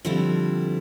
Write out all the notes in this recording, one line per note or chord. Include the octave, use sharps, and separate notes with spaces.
D3 F3 G3 C4 E4